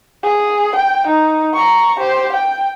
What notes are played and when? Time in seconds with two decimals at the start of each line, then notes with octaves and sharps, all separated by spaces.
0.23 G#4
0.75 G5
1.07 D#4
1.54 A#5 C#6
1.99 G4 C5
2.33 G5